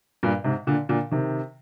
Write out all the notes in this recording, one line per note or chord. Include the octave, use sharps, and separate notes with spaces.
G2 A#2
G#2 C3
A#2 D3
A#2 D3
C3 D#3